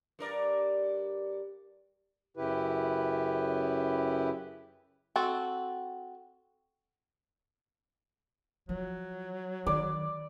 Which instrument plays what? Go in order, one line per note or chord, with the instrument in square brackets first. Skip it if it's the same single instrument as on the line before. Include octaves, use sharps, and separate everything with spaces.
[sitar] G2 A#4 D5
[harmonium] F#2 C#3 E4 G4 B4
[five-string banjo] C4 F#4 A4
[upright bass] F3 [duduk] F#3
[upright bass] D#3 [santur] D5